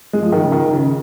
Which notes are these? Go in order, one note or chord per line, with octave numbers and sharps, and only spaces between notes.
G#3
F3
D#3
C#3
D#3
C#3